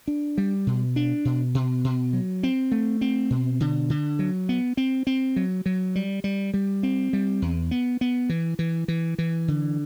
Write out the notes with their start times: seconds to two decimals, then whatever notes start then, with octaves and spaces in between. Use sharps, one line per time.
0.08 D4
0.38 G3
0.67 B2
0.96 D4
1.25 B2
1.54 B2
1.84 B2
2.13 F#3
2.43 C4
2.72 A3
3.01 C4
3.30 B2
3.60 D3
3.90 D3
4.19 F#3
4.49 B3
4.77 C4
5.07 C4
5.36 F#3
5.66 F#3
5.95 G3
6.24 G3
6.54 G3
6.83 C4
7.13 G3
7.42 E2
7.71 B3
8.01 B3
8.29 E3
8.59 E3
8.88 E3
9.18 E3
9.48 D3